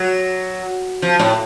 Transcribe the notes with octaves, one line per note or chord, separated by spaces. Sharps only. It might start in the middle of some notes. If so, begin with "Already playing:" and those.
Already playing: F#3
F3
A2